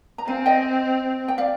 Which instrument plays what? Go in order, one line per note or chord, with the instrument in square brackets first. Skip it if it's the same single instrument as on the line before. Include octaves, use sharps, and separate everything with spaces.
[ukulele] A#5
[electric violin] C4 [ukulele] F5 G#5
[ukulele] D#5 G5
G5
D5 F5